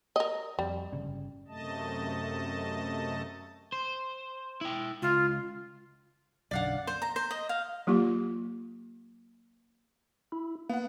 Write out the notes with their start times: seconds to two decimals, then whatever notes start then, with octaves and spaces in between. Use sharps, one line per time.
0.16 A#4 D#5
0.59 F2 G3
0.92 G1 C#3
1.48 F#2 C3 A3 D#5 A5
3.72 C5
4.61 E4 G5
5.02 C#2 F4
6.51 B1 F#2 D3 D5 F5 F#5
6.87 C5
7.02 A#5
7.16 C5
7.31 D#5
7.49 F5
7.87 F#3 A#3 F4 G4
10.32 E4
10.69 A#3 B3 F#5